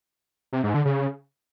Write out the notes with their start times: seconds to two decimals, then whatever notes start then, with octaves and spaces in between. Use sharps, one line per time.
0.53 C3
0.63 G#2
0.74 D3
0.85 C#3